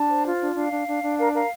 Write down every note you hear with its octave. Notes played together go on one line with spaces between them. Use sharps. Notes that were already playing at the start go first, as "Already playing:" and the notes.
Already playing: D4 A5
C5
F4
D4
D4 F5
D4
D4
D4
A#4 F5
A#4 F5